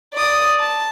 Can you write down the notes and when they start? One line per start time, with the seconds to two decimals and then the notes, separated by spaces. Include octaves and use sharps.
0.14 D5 D#6
0.60 A5